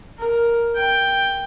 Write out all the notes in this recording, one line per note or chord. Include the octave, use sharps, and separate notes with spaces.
A#4
G5